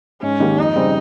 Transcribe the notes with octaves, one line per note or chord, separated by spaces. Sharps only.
G#2 C#4
D#3 A#3 D#4 G4
F2 D#4
C#3 G3 C4